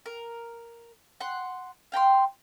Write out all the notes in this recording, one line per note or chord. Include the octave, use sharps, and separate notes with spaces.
A#4
F#5 C6
F5 G5 A#5 C6